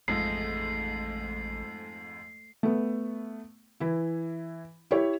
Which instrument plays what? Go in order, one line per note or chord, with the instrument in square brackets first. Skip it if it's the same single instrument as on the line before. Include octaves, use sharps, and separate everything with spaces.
[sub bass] A1 [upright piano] F2 G#2 G#3 [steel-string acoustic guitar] A3 [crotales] C7
[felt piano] A3 B3
E3 E4
E4 G4 C#5